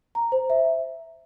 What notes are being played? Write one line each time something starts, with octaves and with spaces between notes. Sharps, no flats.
A#5
C5
E5